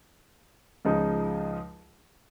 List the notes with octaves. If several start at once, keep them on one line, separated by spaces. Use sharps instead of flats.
C#2 C#3 F3 G#3 D#4